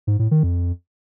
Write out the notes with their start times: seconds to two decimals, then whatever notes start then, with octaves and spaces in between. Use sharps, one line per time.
0.07 G#2
0.19 A2
0.31 D#3
0.43 F2